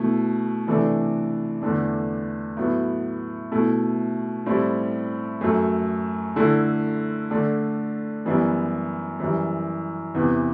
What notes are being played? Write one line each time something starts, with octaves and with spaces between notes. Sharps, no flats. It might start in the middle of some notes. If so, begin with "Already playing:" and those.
Already playing: B2 A3 E4
C3 E3 A3 D4
E2 D3 A3 D4
A2 F#3 B3
B2 A3 E4
A2 G3 C4 E4
F#2 F#3 A3
D3 A3 E4
D3 A3 D4
F#2 E3 G3 B3 E4
F#2 E3 G3
E2 C3 E3 B3